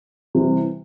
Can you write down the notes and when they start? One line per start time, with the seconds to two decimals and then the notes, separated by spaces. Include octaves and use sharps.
0.35 C3 E3 G3